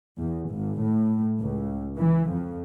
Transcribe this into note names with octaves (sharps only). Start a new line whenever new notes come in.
E2
G#1
A2
C#2
E3
F2